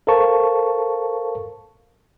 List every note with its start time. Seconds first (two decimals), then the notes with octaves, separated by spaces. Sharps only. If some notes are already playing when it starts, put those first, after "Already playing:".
0.07 A4 A#4 C5 F5 A5 C#6